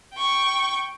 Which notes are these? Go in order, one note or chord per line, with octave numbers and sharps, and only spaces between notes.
G5 C#6